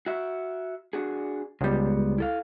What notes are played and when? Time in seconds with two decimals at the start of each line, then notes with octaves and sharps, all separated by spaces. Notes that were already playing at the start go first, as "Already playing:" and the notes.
0.06 F#4 E5
0.93 D4 F#4 G#4
1.61 C#2 G3 G#3 B3
2.18 E4 A4 F5